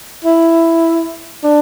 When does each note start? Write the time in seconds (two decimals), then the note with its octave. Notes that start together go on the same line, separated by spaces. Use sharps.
0.24 E4
1.43 D4